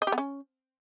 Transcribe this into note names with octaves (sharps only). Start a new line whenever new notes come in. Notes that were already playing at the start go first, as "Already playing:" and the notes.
D#5
G4
B3
C#4